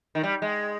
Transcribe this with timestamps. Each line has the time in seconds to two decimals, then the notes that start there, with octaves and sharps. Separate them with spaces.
0.15 D#3
0.23 G3
0.42 G#3